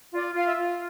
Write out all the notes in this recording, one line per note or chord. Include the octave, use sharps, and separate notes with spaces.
F4 D5
F4 F5
E5
F4